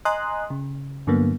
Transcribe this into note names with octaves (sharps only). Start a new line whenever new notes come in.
D#5 G#5 A#5 C6 D#6 F#6
C#3
G2 D3 F#3 A#3 B3